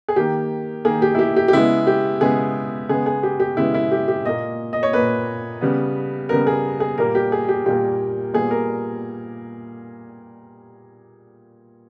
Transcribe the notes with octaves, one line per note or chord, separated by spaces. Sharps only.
G#4
D#3 A#3 G4
D#3 A#3 G#4
G4
E4
G4
G4
G4
C#3 G#3 B3 E4
G4
C#3 G#3 B3 G#4
C#3 G#3 B3 G#4
G#4
G4
G4
C#3 G#3 B3 E4
E4
G4
G4
A#2 A#3 D#5
D#5
C#5
A#2 A#3 B4
C#3 G3 B3
C#3 G3 B3 A#4
G#4
G#4
A#2 G3 A#3 A#4
G4
G#4
G4
A#2 G3 A#3 G4
A#2 G3 B3 G#4
A#4